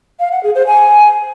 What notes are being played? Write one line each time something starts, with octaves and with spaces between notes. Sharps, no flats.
F5
F#5
G#4
C5
G#5